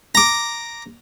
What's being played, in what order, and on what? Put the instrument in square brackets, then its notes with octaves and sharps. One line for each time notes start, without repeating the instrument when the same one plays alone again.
[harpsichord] A#5 D6